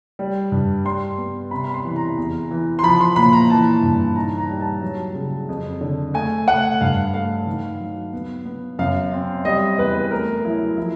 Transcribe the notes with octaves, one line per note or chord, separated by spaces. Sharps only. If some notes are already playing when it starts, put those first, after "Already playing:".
G3
G2
G3 C6
B3
C3 B5
B5
C6
E3
A#5
E2
E3
C6
F3 B5
C6
A#2 B5
A#5
E3 A5
G2
D#4 A#5
A#5
G3
A5
F#3
C#3
F2
D3
A3 G#5
A3 F#5
G2 F5
A3 F5
D#3
F#3
B3
B3
F#2 F5
C4
G3 D#5
E2 B4
B4
A3 A#4
F#3 E4
F3 E4